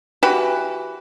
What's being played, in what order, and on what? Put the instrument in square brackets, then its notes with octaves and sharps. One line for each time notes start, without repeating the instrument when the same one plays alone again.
[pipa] E3 F#4 G4 B4